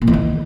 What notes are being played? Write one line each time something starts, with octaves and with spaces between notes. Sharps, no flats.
A#2
E2
D#3